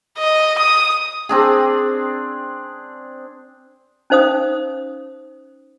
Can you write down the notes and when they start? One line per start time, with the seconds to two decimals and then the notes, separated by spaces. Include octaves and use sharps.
0.18 D#5
0.58 D#6
1.29 C4 D4 G#4
4.10 C#4 D#4 C5 F5 D#6